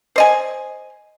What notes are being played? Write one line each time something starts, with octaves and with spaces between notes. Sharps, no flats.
C5 D#5 G#5